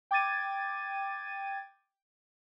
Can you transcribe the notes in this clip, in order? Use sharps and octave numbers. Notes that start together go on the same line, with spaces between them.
G5 D6 G#6 A6 D#7